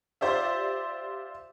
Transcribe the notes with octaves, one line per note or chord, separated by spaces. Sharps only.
F4 G4 C5 D5 E5